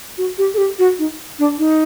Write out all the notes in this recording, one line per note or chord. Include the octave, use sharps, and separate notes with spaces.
F#4
G4
A4
G4
F#4
D#4
D4
D#4